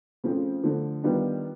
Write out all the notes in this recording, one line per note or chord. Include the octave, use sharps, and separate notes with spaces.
C#3 F3 A3 C4 F4
D3 F3 A3
D#3 G3 B3 D4 F4